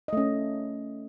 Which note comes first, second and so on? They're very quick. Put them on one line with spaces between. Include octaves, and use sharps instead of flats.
D#5 A3 C#4